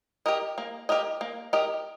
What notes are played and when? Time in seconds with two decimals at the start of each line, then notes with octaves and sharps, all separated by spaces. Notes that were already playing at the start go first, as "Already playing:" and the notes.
0.26 G4 A#4 D#5
0.58 A#3
0.89 G4 A#4 D#5
1.21 A#3
1.53 G4 A#4 D#5